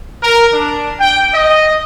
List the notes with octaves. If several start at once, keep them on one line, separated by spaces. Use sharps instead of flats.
A#4
D4
G5
D#5